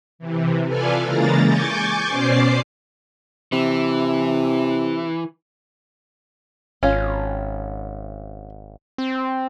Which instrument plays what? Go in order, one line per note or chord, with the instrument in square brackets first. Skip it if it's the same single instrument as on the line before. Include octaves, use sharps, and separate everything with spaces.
[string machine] C3 E3
F4 A4 B4 D5 G#5 F6
C#3 E3 G#3 A#3 A#5 A6
G#5 C#6 D6 G6 A6
B2 C#4 C5 D5 D6 C7
[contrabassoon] C3 [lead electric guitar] E3
[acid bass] G#1 [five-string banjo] C#4 F4
[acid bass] C4